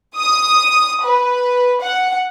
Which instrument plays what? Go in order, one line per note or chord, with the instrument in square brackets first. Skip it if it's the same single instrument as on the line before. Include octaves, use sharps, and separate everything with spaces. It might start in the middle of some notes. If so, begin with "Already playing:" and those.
[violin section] D#6
B4
F#5